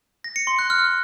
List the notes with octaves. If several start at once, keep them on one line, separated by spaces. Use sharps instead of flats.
A#6
C#7
C6
F#6
F6